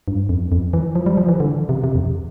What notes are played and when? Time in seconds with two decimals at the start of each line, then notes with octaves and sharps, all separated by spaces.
0.08 G2
0.29 F2
0.52 F2
0.73 E3
0.95 F3
1.06 G3
1.17 F3
1.29 E3
1.40 D3
1.69 C3
1.84 C3
1.95 F2